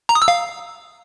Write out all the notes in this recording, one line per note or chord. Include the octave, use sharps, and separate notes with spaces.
A#5
D#6
E6
F5